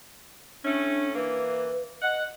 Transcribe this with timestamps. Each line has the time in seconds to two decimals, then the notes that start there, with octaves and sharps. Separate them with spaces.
0.64 A2 A3 C#4 D4
1.15 E3 A#3 B4
2.02 D#5 F#5